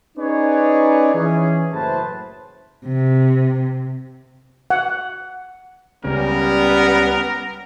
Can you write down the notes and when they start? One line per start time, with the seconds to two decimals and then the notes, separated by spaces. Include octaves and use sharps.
0.17 C#4 D#4 G#4 B4 C#5 D5
1.15 E3 C#4 G#4
1.73 F#1 A2 B4 C5 A5
2.85 C3
4.70 F#5
6.05 C#2 C#3 G3 B3 C#4 A#4